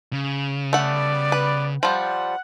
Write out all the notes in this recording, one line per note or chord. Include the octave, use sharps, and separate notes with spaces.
C#3
G3 A3 B3 D5 F#5
B4
F3 G3 F#5